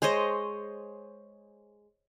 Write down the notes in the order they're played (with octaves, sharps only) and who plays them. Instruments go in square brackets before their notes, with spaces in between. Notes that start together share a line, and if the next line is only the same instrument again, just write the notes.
[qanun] G#3 C5 C#5 D#5